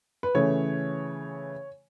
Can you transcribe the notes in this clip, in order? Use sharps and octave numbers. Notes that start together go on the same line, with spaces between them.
B4
C#3 E3 A3 C#5